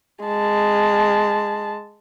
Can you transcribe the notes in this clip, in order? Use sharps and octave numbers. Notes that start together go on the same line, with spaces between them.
G#3 A5